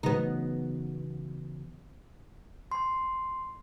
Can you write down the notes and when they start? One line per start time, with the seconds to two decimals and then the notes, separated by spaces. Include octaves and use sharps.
0.03 C#3 E3 F#3 B3 D#4
2.71 C6